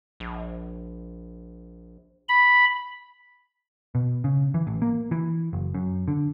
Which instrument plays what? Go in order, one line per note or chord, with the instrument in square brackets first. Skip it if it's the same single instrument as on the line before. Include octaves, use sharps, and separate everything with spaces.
[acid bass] A#1
[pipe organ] B5
[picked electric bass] B2
C#3
E3
A1
A#3
E3
F#1
F#2
D3